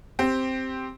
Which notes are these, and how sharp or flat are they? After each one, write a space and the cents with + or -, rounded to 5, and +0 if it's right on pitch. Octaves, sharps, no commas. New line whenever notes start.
C4 +0 G4 +0